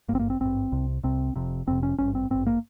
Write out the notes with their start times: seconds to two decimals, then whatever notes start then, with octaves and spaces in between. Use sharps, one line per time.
0.08 G2 A#3
0.12 G#1 C4
0.19 A#3
0.30 C4
0.40 G#1 G2 C4
0.72 C2 C3
1.04 C2 C3 C4
1.36 F1 F2 C3
1.67 F1 F2 C3 C4
1.83 C#4
1.99 G#1 G2 C#4
2.15 C4
2.30 G#1 G2 C4
2.47 A#3